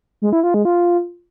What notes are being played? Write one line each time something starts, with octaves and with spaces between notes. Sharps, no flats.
G#3
E4
F4
G#3
F4